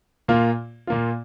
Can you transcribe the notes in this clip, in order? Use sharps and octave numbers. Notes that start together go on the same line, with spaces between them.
A#2 A#3 F4
A#2 A#3 F4